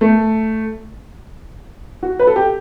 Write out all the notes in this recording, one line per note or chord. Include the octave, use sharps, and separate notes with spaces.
A3
F#4
B4
A4
G4